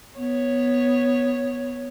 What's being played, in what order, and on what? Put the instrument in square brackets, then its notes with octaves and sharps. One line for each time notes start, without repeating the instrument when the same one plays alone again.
[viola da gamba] B3 C#5